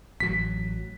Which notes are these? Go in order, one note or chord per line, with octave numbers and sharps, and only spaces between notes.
A1 F#3 B6